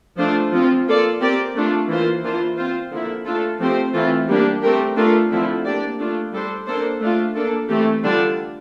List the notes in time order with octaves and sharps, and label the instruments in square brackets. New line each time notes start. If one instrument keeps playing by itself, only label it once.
[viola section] F3 A3 D4 F4 C5
F3 C4 F4
A#3 F4 A4 D5
C4 G4 A#4 D5
A3 D4 F4
E3 A#3 F4 C5
E3 A#3 D4 F4 C5
C4 F4 C5
D3 F3 A#3 E4
A3 D4 F4 A4
F3 A3 C4 G4 C5
E3 A3 C4 F4
G3 A#3 D4 G4
A3 C4 G4 A#4
A3 D4 F4 A#4
D3 F3 A3 C4 E4
A#3 D4 G4 D5
A3 D4 F4
G3 D4 A4 C5
A#3 D4 A4 C5
A3 D4 F4
A#3 D4 A4
E3 A3 C4 G4
D3 G3 D4 F4